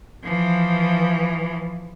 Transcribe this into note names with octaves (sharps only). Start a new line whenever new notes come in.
E3 F3